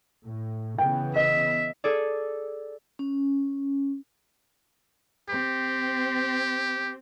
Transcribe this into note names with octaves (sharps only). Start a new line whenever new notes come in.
A2
C#3 E3 B3 G5
D#5 E5
G#4 A4 D5
C#4
C4 G4